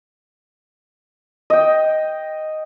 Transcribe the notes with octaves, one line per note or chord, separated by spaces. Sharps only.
D#5 G5